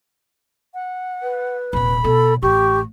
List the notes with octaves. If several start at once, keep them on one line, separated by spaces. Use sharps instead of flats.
F#5
B4
D#1 C3 B5
B2 A4
A1 C#4 G4 C#6